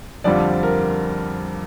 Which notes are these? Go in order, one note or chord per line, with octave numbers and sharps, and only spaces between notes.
F2 D3 G3 C4 F4 D5
A#4